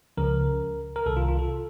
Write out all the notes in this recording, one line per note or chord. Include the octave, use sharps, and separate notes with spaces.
C#2 C#3 F3 A#4
A#4
C2 C3 D#3 A4
F4
F4
A4